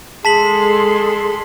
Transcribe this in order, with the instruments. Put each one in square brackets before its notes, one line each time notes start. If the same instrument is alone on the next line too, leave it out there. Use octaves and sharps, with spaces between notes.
[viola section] G#3 A4 C6 [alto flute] G#4 [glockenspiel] A5 B6 F#7